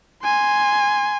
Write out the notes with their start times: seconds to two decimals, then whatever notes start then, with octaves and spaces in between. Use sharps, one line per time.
0.23 G#5 C6